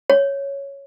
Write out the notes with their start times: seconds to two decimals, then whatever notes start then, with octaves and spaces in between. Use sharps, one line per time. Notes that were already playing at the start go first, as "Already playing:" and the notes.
0.10 C#5